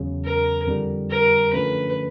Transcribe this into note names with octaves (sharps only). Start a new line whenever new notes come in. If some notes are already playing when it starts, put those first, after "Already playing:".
Already playing: E2 C#3 F#3
A#4
F2 D3 G3
A#4
F#2 D3 F3 A3 C#4 B4